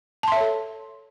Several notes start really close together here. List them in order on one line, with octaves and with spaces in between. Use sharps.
A5 C6 E5 C#5 A4